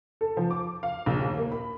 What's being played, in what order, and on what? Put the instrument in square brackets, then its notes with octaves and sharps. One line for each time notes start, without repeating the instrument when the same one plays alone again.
[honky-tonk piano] A4
F3
D6
F5
A#1
D#2
A#3
B5